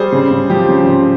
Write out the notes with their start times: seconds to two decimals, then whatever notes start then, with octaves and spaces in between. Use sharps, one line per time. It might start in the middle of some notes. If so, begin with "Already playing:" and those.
Already playing: G3 G#4 C5
0.12 C#3
0.31 C#3
0.49 F3 G4
0.69 C#3
0.87 C#3